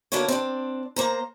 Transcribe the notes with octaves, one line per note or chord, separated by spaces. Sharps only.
D3 A#3 B3 D4 F#4 C#5
C4 D4
A#3 C5 A#5